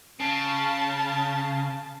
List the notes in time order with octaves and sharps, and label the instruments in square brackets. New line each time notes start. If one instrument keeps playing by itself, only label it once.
[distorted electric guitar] C#3 [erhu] A5